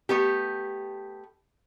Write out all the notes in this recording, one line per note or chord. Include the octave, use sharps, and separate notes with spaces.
A3 B3 G4